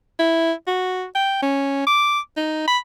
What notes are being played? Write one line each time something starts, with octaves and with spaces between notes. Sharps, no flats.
E4
F#4
G5
C#4
D6
D#4
B5